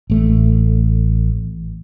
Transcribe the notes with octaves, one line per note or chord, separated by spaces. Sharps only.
A1 A3